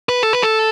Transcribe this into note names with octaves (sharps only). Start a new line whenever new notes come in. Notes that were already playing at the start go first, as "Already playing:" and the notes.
B4
A4
B4
A4